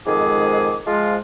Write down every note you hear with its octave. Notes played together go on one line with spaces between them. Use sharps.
F2 G#2 D#3 G#3 G#4 D6
F3 G#3 F4